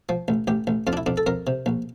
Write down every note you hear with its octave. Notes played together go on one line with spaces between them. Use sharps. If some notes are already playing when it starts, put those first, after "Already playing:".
F3
A1
A1 G4
A1
F2 F4
D4
E4
F2 D4
A4
F2 A#4
C3
A#1